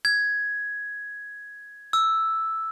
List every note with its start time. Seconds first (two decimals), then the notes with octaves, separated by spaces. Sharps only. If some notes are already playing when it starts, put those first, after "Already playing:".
0.05 G#6
1.93 E6